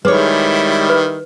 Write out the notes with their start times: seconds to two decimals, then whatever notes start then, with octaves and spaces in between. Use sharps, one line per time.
0.05 D#3 G3 G#3 E4 B4 C#5 D6
0.89 B4